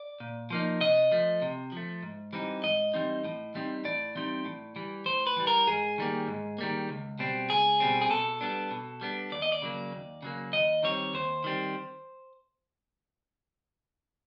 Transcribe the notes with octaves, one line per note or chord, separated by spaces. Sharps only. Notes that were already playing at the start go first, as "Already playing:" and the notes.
Already playing: D5
A#2
F3 A#3 D#4
C3 D#5
F3 A3
C3
F3 A3
G#2
E3 G3 C4 D#4
G#2 D#5
E3 G3 C4 D#4
A2
E3 G3 C4 D#4
A2 D5
E3 G3 C4 D#4
A2
E3 G3
A2 C5
B4
E3 G3
A#4
G#2 G#4
D#3 G3 A#3
G#2
D#3 G3 A#3
C#2
B2 G3 C4
C#2 G#4
B2 G3 C4
G#4
B2 A4
G3 B3 D4
B2
G3 B3 D4
D#2 D5
D#5
D5
C#3 F#3 A#3
D#2
C#3 F#3 A#3
D#2 D#5
D#3 G3 C4 C#5
D#2 C5
D#3 G3 C4